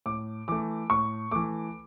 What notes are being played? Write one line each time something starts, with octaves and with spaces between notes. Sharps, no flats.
A2 D6
E3 A3 D6
A2 C#6
E3 A3 D6